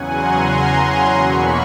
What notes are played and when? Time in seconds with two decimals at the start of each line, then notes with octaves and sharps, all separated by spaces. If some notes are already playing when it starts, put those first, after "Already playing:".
Already playing: E2 C#3 F#3 F#5 G#5
0.12 A#5 C6
1.16 E2 B2 F#3 A#3 B5 C#6